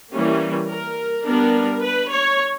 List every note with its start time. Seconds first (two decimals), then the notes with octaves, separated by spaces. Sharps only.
0.11 E3 G3 A#3 C#4
0.68 A#4
1.25 G3 B3 D4 A#4
1.83 B4
2.11 C#5